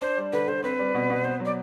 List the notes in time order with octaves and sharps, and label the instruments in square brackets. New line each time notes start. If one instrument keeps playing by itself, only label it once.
[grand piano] D4 [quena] C5
[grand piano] G3
[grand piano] D3 [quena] B4
[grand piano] D3 [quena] C5
[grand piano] C4 [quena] B4
[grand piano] G3
B2
B2
[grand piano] B3 [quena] C5
[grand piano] F#3 [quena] D5